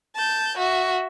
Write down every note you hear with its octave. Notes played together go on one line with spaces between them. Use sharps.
A5 G6
F#4 E5